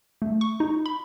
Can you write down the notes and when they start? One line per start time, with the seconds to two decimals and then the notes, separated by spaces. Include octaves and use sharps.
0.22 A3
0.41 C#6
0.60 D#4
0.86 B5